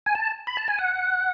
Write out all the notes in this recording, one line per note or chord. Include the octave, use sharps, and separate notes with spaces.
G#5
A5
B5
A5
G#5
F#5